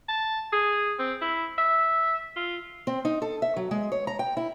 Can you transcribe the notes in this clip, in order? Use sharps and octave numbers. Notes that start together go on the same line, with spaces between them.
A5
G#4
C4
E4
E5
F4
C4
D#4
A4
E5
F#3
G#3
C#5
A#5
G5
E4